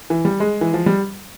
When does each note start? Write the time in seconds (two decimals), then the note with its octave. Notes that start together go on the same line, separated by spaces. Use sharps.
0.10 E3
0.25 G3
0.40 G#3
0.61 E3
0.74 F3
0.86 G3